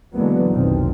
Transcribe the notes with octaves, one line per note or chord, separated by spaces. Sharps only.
D3 E3 F#3 G#3 A#3 B3
F1 B1 B2 D#3 F3 C4